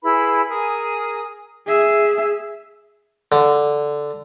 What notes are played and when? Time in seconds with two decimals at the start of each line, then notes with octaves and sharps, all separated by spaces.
0.03 E4 G#4 B4 B5
0.48 G#4 A#4 G#5 D#6
1.67 G#4 E5
3.32 D3